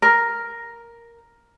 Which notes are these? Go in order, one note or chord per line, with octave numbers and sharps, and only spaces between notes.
A#4